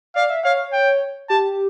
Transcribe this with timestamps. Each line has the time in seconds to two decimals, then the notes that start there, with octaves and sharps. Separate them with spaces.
0.16 D5 F5
0.30 E5
0.44 C#5 F5
0.73 G5
1.29 G4 A5